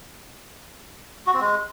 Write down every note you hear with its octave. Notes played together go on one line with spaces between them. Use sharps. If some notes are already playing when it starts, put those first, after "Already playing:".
F#4
C4
G#3